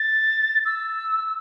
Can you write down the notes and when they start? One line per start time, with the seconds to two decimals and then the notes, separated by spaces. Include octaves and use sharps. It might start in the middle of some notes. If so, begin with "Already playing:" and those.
Already playing: A6
0.65 E6